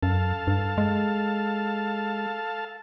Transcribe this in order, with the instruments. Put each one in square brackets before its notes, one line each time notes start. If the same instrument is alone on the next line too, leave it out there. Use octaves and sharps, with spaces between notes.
[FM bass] F#2 [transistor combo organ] A4 F5 A5
[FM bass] G2
G#3